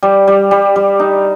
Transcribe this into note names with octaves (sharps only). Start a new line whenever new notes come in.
G3
G3
G3
G3
D#4